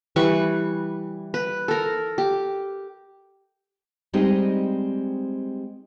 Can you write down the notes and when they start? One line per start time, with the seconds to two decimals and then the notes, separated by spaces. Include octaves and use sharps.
0.16 E3 G3 B4 C#6
1.34 B4
1.68 A4 A#4
2.18 G4
4.13 G3 G#3 C4 D#4 G4 D#5